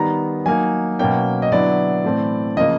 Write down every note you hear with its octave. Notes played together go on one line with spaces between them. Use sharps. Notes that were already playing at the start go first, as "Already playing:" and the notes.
Already playing: D#3 G3 B3 A#5
F#3 A#3 D#4 G#5
B2 F#3 A#3 C#4 G5
D#5
D3 F#3 B3 E4 D5
A2 E3 A3 C4
C#3 F3 A#3 D#5